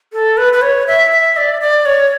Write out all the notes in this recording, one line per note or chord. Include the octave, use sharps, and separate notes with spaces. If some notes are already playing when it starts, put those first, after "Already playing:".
A4
B4
B4
C#5
E5
E5
D5
D5
C#5